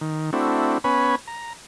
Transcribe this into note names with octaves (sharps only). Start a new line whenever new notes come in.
D#3
A3 C4 D4 E4 F#4
B3 C#4 B4 C#5 G#5 B5
A#5